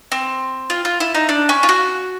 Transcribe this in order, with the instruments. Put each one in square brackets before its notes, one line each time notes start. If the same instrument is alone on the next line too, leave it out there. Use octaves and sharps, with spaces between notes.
[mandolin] C4
F4
F4
E4
D#4
D4
C#4
F4
F#4